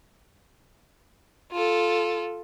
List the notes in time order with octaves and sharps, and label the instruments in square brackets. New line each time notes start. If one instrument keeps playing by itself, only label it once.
[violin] F4 A4